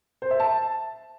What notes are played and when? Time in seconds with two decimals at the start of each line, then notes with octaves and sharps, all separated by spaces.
0.22 C5
0.31 E5
0.40 A5